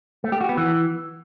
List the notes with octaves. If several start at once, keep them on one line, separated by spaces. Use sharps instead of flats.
A3
G4
F#4
B3
E3